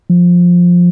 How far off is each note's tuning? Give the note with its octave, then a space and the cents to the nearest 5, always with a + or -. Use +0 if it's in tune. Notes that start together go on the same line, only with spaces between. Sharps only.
F3 +10